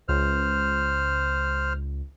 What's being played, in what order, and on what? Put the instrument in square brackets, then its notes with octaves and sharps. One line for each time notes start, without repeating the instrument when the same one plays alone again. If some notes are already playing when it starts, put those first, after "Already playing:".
[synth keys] C#2 [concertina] C5 F6